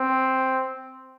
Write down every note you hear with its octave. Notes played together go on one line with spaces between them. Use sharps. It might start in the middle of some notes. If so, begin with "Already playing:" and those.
Already playing: C4